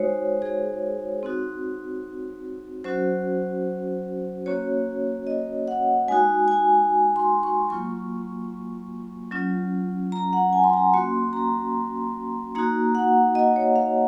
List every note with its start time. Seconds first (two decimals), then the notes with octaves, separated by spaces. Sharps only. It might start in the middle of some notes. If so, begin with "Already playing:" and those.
Already playing: G#3 D#4 F#4 C5 C#5
0.42 G#4
1.23 C4 D#4 F#4
2.84 F#3 C#4 F#4 C5
4.46 A#3 C#4 F#4 C#5
5.27 D#5
5.68 F#5
6.08 G#3 D#4 F#4 G#5
6.48 G#5
7.16 C6
7.43 C#6
7.69 F#3 A#3 F4 C#6
9.31 F#3 C#4 F4
10.12 A#5
10.33 F#5
10.53 G#5
10.64 C6
10.73 A#5
10.94 A#3 C#4 F#4 C6
11.33 A#5
12.55 A#3 D#4 F#4 A#5
12.95 F#5
13.35 D#5
13.56 C#5
13.76 F5